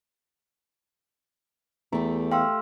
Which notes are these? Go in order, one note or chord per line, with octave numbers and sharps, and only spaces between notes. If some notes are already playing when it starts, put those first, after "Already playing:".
E2 A3 G4 A#5
F5 G5 C6 E6